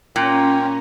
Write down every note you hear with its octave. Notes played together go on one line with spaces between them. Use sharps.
A#2 C#4 F4 G5 A#5